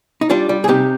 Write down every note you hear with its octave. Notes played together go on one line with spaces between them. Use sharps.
D#4
G3 D4 F4
G3
G#4
C3 D#4 G4